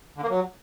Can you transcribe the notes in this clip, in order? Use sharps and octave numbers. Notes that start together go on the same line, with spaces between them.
D3
A#3
F#3